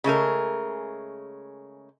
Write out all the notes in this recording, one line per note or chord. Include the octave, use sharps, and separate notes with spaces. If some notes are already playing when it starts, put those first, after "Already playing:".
C#3 G#3 A3 A#4